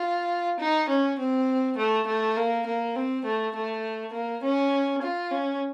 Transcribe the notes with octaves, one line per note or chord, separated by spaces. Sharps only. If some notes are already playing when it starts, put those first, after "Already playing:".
Already playing: F4
D#4
C#4
C4
A3
A3
A#3
A#3
C4
A3
A3
A#3
C#4
F4
C#4